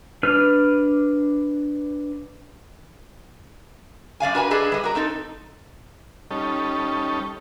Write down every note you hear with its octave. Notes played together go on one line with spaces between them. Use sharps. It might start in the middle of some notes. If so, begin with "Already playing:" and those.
D4 B4 F6
F#2 D5 F5 G#5
D4 F#4 A#4 B4 G#5
D4 G#4 A4 B4 D#5
G3 D#5
F#4 A#4
C4 D#4 A4
G3 C#4 D#4 A4